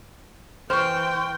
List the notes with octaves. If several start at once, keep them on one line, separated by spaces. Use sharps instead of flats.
E3 C5 G5 C#6 F6